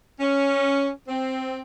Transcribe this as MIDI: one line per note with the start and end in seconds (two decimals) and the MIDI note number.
0.20 0.89 61
1.07 1.59 60